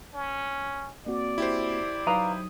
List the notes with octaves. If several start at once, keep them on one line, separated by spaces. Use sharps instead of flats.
C#4
A#3 C4 F#4 D5
E4 G4 C5
F#3 D#4 B4 F5 A#5 D#6